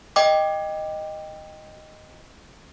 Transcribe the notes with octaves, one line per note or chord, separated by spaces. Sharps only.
D#5 G5 D6